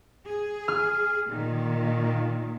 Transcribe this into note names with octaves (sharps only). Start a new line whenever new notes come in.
G#4
F6
A#2 D#3